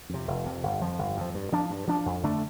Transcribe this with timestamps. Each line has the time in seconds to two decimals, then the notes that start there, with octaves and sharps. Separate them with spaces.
0.09 F2 C3
0.28 F1
0.46 F2 C3
0.63 G1
0.81 F2 F3
0.99 G1
1.17 F2 F3
1.34 G2
1.52 F3 D4
1.70 G2
1.88 F3 D4
2.06 F2
2.23 D3 A3 D4